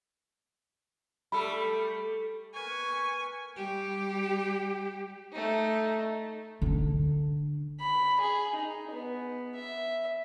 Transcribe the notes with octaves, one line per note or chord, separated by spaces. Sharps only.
G3 A3 A4 B5
A#4 B4 G#5 C#6
G3 G4
A3 D#4
D3 D4
B5
G#4
D#4
B3
E5